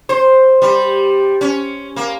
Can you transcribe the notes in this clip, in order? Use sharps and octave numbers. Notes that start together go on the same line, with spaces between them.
C5
G3
C#4
A#3